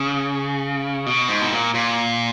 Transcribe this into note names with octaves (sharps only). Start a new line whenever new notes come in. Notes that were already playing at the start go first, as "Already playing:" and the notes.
Already playing: C#3
B2
G#2
B2
A#2
A#2